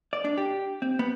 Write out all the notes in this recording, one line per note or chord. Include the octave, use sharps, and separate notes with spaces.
D5
D4
G4
C4
B3